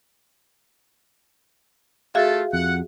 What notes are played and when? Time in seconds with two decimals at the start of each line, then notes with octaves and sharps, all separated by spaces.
2.15 A3 F4 F#4 G#4 A4 E5 F5
2.53 F2 F#5